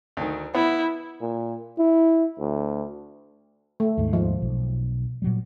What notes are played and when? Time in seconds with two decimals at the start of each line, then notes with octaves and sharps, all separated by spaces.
0.17 D2 D#3
0.55 B3 E4
1.21 A#2
1.78 E4
2.39 D2
3.80 A3
3.98 D#2 G#2
4.13 F3
4.42 B1
5.22 A#2 F#3 G3